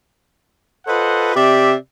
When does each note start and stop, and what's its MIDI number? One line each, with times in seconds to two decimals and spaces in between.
0.87 1.33 65
0.87 1.33 69
0.87 1.33 71
0.87 1.33 72
0.87 1.33 75
0.87 1.33 78
1.36 1.74 48
1.36 1.74 67
1.36 1.74 74
1.36 1.74 76